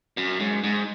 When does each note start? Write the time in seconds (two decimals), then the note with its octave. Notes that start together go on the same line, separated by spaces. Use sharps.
0.17 F#2
0.40 G#2
0.64 G#2